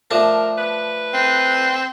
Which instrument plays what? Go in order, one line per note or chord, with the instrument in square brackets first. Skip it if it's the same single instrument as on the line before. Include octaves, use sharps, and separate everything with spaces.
[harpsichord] F3 A3 D4 [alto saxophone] A#4
[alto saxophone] B4
[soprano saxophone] C4